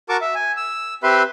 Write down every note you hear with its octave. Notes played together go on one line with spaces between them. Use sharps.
F#4 A#4 A5 C#6 D6
E5
G#5
E6
C4 G4 B4 E5 B5 C6